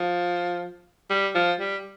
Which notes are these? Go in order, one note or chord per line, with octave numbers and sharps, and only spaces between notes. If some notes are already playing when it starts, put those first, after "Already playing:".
Already playing: F3
G3
F3
G3